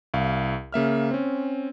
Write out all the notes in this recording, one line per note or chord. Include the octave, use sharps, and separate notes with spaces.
C2 F5
C#3 A#3 E5 F6
C4 C#4